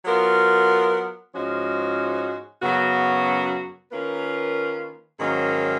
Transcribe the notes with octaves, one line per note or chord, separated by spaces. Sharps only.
F#3 B3 F4 A#4
G#2 F3 G#3 C#4 F#4
F#2 C#3 F#3 B3 F#4
D#3 A#3 C#4 F4 B4
G#2 D#3 F#3 A#3 C#4